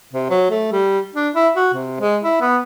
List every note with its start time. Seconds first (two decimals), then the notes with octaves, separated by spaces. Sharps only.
0.13 C3
0.30 F#3
0.50 A3
0.72 G3
1.15 D4
1.35 E4
1.56 F#4
1.74 C3
2.01 G#3
2.23 E4
2.41 B3